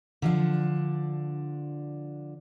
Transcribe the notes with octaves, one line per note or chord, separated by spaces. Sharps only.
D3 F3 D4